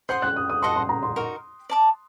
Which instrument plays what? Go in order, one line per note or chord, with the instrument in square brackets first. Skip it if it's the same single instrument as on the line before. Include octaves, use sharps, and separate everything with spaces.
[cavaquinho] C5 F#5 C6 D#6 [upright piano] G6
[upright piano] F#6
D#6
D#6
[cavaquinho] F#4 A4 D#5 F#5 [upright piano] C6
[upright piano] C6
A#5
C6
[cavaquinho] D#4 F#4 A#4
D5 A5 D6